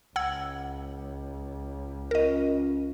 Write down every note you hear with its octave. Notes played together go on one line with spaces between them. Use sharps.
C#2 F#5 E6 G#6
C#4 F4 A#4 D#5